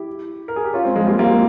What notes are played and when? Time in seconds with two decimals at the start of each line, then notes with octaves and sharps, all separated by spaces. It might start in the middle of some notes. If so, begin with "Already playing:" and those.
Already playing: E4 G4
0.48 A#4
0.56 G#4
0.65 G4
0.73 C#4 F4
0.84 G#3 C4
0.96 F3 G#3
1.07 G3 A#3
1.18 G3 A#3
1.30 F3 G#3